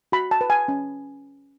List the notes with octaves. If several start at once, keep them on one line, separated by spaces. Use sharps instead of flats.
F#4 B5
A5
B4
G#5
C#4